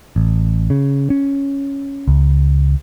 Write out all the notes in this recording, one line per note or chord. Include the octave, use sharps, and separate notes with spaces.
A1
C#3
C#4
C#2